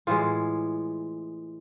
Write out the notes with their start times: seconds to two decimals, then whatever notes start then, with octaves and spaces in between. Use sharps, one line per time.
0.07 A2 E3 G#3 F4